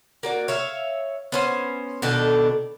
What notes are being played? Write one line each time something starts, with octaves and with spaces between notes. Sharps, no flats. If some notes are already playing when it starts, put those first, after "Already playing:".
A#3 F#4 D5
C#5 E5 F5
B3 C#4 C5
B2 D#3 D4 A4